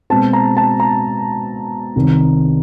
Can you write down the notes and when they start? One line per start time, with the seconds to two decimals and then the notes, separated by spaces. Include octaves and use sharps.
0.10 B2 G#3 C4 A5
0.33 A#5
0.57 A5
0.80 A#5
1.96 C2 C3 D#3 G3